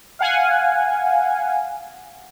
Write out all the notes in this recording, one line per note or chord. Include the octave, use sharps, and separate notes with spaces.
F5 F#5 G#5